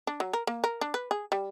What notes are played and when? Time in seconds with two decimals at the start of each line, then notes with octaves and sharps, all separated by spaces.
0.07 D4
0.20 F#3
0.33 A#4
0.47 A#3
0.64 A#4
0.81 D4
0.94 B4
1.11 G#4
1.32 G3